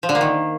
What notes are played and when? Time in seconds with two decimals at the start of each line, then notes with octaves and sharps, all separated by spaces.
0.03 F3
0.09 D3
0.15 A#3
0.21 D#3